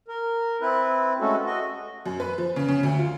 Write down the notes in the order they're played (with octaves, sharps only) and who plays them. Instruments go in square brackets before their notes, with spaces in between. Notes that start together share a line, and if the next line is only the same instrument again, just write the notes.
[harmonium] A#4
C4 E4 B4
G#3 A3 C#4 F#4 A4
F#4 D#5
[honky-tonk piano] F#2
B4
F3
C#3
C#3
D2
F4